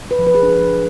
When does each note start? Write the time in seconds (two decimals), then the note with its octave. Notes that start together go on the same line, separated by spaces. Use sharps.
0.11 B4
0.19 F3
0.27 B4
0.35 G#4
0.43 D4